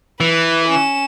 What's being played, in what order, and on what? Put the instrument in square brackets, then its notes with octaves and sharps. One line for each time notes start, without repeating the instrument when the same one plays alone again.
[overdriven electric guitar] E3 [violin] B4
[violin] C#4 E7